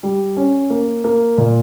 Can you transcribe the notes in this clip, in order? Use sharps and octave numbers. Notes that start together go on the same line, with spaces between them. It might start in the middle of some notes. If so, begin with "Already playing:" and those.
G3
C#4
A#3
A#3
A#2